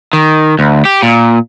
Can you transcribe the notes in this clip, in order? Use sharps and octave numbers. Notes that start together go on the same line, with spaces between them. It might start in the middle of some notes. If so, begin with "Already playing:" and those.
D#3
D2
G4
A#2